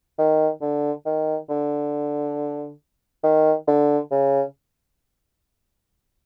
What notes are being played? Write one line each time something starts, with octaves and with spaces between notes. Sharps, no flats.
D#3
D3
D#3
D3
D#3
D3
C#3